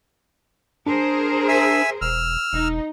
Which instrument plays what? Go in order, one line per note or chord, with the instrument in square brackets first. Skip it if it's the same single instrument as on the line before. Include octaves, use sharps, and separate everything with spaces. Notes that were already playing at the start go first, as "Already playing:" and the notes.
[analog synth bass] D4 [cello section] G#4 A#4 C5
[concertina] E5 G#5 E6
[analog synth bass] E1 [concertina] E6 F6
[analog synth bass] E1 [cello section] D#4